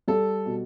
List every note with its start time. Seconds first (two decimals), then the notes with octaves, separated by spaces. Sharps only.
0.08 G3 A4
0.46 B2